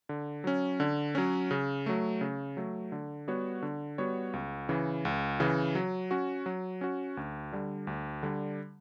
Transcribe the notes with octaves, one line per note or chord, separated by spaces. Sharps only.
D3
F#3 C#4
D3
F#3 C#4
C#3
F#3 A3
C#3
F#3 A3
D3
G3 B3 F#4 C#5
D3
G3 B3 F#4 C#5
C#2
C#3 E3
C#2
C#3 E3
F#3
C#4 F#4
F#3
C#4 F#4
D2
D3 G3
D2
D3 G3